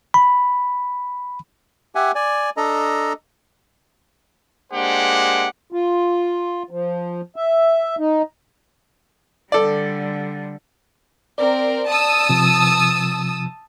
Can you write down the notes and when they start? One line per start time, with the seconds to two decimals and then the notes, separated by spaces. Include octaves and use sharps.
0.14 B5
1.95 G4 E5 F#5 G#5
2.15 D5 G#5
2.57 D4 A4 D#5 A#5
4.72 G#3 A#3 D4 G4 C5 F#5
5.72 F4
6.71 F3
7.36 E5
7.99 D#4
9.52 D3 G3 A4 D5
11.38 C4 A#4 D5
11.88 A5 D#6 E6
12.29 C3 F3